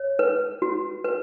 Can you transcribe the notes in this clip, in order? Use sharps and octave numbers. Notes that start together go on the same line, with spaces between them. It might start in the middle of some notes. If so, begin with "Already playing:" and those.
Already playing: C#5
B4
F#4
B4